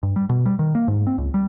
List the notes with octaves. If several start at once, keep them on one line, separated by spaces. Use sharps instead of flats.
G2
G3
B2
G3
D#3
A#3
G#2
C4
C#2
G3